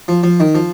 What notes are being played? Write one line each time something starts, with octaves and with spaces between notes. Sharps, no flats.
F3
F3
D#3
F3